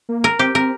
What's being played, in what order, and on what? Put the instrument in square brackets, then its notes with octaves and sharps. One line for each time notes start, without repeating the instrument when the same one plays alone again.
[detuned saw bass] A#3
[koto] A#4
[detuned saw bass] C4 [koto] G4
[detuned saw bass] C4 [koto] A#4